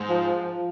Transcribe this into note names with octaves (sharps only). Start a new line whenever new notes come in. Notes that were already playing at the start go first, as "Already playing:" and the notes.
Already playing: G#2
F3